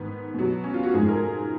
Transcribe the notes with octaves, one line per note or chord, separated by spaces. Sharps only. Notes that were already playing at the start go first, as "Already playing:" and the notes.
Already playing: G#2 D#3 B3
B2 F#3
C#4
F4
F#4
G#2 F3 G#3 G#4
A#4